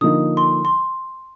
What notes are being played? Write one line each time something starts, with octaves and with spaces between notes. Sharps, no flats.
D3 F3 A#3 D#4 D#6
C6
C6